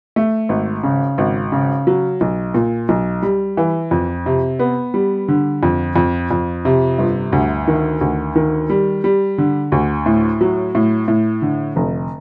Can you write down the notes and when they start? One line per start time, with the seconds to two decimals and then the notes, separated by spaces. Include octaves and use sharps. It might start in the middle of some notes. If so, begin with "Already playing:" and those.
0.16 A3
0.49 G#1
0.83 C#3
1.18 G#1
1.52 C#3
1.87 F#3
2.21 B1
2.54 A#2
2.89 B1
3.23 G3
3.57 E3
3.91 F2
4.26 C3
4.59 B3
4.94 G3
5.28 D3
5.63 F2
5.96 F2
6.31 F2
6.65 C3
6.98 G1
7.33 D2
7.68 D#3
8.01 D2
8.35 D#3
8.70 G3
9.04 G3
9.38 D3
9.72 D2
10.06 A2
10.41 F#3
10.75 A2
11.08 A2
11.42 D3
11.76 F1